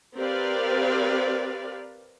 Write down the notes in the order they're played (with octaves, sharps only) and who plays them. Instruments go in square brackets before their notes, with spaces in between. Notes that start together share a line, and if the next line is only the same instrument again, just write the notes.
[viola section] C4 G4 A#4 B4 D5 F5